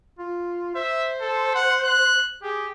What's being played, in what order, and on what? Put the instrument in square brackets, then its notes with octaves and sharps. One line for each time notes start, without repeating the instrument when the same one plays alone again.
[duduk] F4
[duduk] C5 [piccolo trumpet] E5
[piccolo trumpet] A4
F#5
F#6
[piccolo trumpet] G4 [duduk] G#4